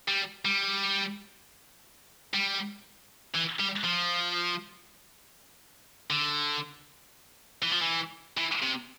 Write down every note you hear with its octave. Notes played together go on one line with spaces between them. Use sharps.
G3
G3
G3
E3
G3
F3
D3
E3
F3
E3
E3
C3